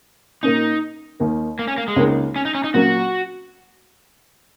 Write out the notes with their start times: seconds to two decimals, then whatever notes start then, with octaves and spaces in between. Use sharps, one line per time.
0.43 A#2 A#3 C#4 D#4
1.20 D#2 D#3 A#3
1.59 A#3
1.67 C#4
1.78 A#3
1.88 G#3
1.96 C#2 C#3 A#3 D#4
2.36 C#4
2.45 D#4
2.55 C#4
2.64 D#4
2.74 A#2 F#3 A#3 C#4 F#4